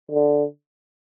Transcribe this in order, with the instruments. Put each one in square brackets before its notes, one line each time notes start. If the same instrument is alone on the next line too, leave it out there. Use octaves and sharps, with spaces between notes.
[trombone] D3